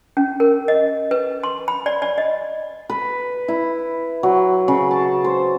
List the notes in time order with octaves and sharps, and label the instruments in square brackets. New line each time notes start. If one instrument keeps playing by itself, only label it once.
[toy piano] C#4
A#4
D#5
B4
C6
B5
D5
D5
D#5
[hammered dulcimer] B4
E4
F#3
C#3
A5
C5